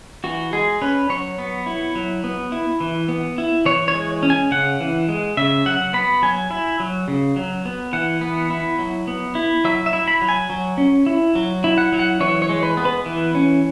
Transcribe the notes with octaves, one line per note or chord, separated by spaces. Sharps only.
E3 F#4
G#3 G#4
C#4 B4
F#3 C#5
B3
E4
F#3
B3
E4
E3
B3
E4
E3 C#5
C#5
G#3
C#4
G#5
C#3 F#5
E3
G#3
C#3 E5
F#3 F#5
B3 B5
F#3 G#5
E4
F#3
C#3
F#3
B3
E3 F#5
B3
E4
F#3
B3
E4
F#3 E5
E5
E4
B5
F#3
G#5
F#3
C#4
E4
F#3
E4
F#5
F#3
F#5
E3 C#5
C#5
G#3
B4
B3
B4
E3
C#4